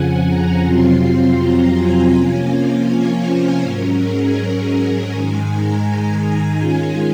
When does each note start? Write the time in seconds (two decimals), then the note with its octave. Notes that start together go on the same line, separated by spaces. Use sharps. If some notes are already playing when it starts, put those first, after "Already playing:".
Already playing: F2 C#3 F3 F#5 G#5
0.26 A#5
0.64 F2 C3 F#3 C4 F4 C6
1.37 A#5
1.75 G#5
2.12 C3 F3 A#3 C#4 F4
2.87 C#5
3.25 C5
3.62 G#2 F#3 C#4 A#4
4.00 G#4
4.36 A#4
5.12 G#2 D#3 G#3 G#5
5.48 A#5
6.23 G#5
6.60 D#3 G#3 C#4 F4